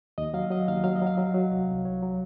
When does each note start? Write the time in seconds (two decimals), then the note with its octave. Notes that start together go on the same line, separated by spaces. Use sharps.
0.18 D#2 D#5
0.34 F#3 F5
0.50 F#3 D#5
0.68 D#2 F5
0.84 F#3 F5
0.96 D#5
1.02 F#3
1.07 F5
1.17 F#3
1.34 F#3
1.51 C2
1.68 C2
1.85 F#3 C#5
2.02 F#3